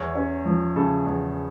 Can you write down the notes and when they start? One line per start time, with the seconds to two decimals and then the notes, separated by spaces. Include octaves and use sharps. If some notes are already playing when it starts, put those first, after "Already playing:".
Already playing: E2 C#5
0.15 C#4
0.45 F3
0.76 C#3 A4
1.06 E2